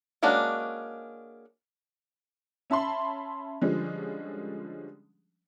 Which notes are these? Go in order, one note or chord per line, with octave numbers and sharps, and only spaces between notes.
G#3 A#3 C#4 D4 F#4
C#4 E5 A5 B5 C6
D3 F3 G3 G#3 C#4